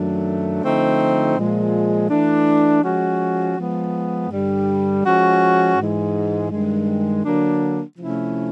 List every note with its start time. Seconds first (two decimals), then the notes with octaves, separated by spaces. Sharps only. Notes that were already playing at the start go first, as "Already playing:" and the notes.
Already playing: F#2 D#3 F#3 A3 D4
0.62 D3 F3 A3 C4 D#4
1.36 A#2 F3 G#3
2.09 E3 A3 D4
2.83 F3 G#3 C#4 F#4
3.57 F3 G#3 B3
4.29 G2 D3 G3
5.04 F3 G#3 C#4 F#4
5.77 G#2 E3 G#3
6.50 G2 D#3 G#3
7.24 D3 F#3 A#3 D4
7.98 C3 F3 A3 C#4 E4